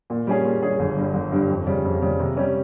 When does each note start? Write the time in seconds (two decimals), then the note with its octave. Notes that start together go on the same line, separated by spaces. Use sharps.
0.10 A#2
0.27 G3 C#4 G#4
0.45 A#2
0.62 G3 C#4 G#4
0.79 G1
0.97 G2 G3
1.14 G1
1.32 G2 G3
1.49 F2
1.67 C#3 G3
1.85 F2
2.02 C#3 G3
2.20 C3
2.37 G3 C#4